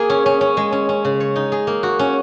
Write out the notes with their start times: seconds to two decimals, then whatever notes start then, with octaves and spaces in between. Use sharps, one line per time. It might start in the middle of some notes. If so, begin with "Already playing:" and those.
Already playing: A#3 G#4
0.10 C#4
0.26 C#4
0.41 C#4
0.57 G#3
0.72 C#4
0.89 C#4
1.05 C#3
1.20 C#5
1.36 D#4
1.52 G#4
1.67 A#3
1.83 F#4
1.99 C#4